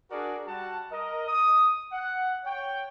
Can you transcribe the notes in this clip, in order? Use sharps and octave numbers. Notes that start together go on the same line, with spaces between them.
D4 F#4 G#4 A#4 D5
G3 F#4 F#5 A5
A#4 D#5
D#6
F#5
C#5 G5